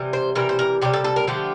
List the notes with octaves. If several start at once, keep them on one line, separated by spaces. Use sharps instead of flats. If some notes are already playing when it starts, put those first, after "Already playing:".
Already playing: C3 E3 G3
C5
C3 E3 G3 A#4
C5
A#4
C3 E3 G3 G4
A4
A4
A#4
D3 F3 A3 G4